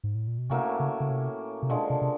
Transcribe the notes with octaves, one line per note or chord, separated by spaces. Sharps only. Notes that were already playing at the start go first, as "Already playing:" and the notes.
G#2
A2
A#2
B2
A2 C3 F#3 A#3 C#4
C#3
C#3
C3
C3
B2 D3 F3 G#3
C3
C3